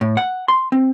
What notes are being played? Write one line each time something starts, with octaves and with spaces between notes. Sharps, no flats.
A2
F#5
C6
C4